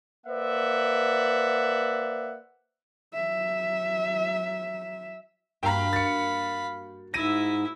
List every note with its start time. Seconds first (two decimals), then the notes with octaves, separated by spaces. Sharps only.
0.26 A#3 B4 C5 D5 E5 F#5
3.14 F#3 E5
5.63 G2 A#3 F#4 F5 G5 A#5 B5
5.93 F#4 A6 C#7
7.14 G#2 E4 E5 A#6 D#7